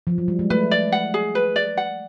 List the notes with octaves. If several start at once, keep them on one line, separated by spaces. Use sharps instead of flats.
F3
F#3
G3
G#3
A3 B4
D5
F#5
G#4
B4
D5
F#5